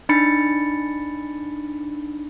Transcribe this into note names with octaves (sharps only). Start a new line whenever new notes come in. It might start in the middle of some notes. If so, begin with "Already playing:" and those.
D4 D#4 B5 A6 C#7